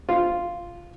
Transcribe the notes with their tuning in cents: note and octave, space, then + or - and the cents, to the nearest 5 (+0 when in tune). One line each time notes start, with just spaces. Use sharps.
F4 -5